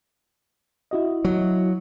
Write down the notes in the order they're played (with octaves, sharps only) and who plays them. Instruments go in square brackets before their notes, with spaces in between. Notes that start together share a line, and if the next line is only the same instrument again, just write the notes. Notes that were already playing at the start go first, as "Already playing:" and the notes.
[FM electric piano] E4 F#4 D#5
[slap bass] F#3